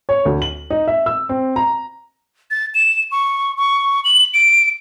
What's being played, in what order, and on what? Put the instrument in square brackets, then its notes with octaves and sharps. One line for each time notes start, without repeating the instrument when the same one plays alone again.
[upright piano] C#5
D2
F#7
D#4
E5
E6
C4
A#5
[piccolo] A6
E7
C#6
C#6
F#7
D7